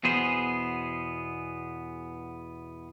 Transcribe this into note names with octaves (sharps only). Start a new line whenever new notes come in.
E2 B2 B3 G#4 C5